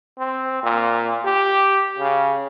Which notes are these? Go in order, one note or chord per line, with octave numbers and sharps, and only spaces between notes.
C4
A#2
G4
C#3